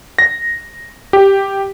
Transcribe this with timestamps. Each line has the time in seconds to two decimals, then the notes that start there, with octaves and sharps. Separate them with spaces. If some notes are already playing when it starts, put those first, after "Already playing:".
0.19 A#6
1.13 G4